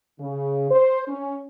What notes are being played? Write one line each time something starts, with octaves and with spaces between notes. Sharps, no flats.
C#3
C5
C#4